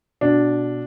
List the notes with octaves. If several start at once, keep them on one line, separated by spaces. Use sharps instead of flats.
B2 D4